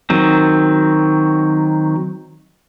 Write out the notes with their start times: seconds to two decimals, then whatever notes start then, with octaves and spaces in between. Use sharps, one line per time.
0.10 D#3 F#3 C4